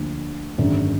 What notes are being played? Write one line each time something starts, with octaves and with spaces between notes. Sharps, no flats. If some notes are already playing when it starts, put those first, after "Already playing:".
Already playing: D2 D3 F3 A#3
G#1 F#2 D3 G#3 D4